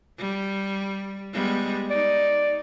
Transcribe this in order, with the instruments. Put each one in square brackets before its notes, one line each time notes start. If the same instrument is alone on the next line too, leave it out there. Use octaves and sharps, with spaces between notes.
[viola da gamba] G3
G3 G#3 B3
[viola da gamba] D#4 [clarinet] D5